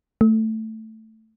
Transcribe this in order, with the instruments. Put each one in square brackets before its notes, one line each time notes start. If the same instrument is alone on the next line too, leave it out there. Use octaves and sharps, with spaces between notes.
[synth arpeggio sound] A3